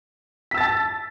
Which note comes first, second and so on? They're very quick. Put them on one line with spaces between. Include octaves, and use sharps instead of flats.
B6 E6 A6 A5